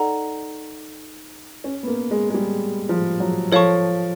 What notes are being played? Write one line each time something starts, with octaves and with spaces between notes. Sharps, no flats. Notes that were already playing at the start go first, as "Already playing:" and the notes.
Already playing: D#4 A4 D5 F#5 A#5
C#4
B3
A#3
G#3
G#3
G3
F3
F#3
F3 A4 C#5 F5 A5 C#6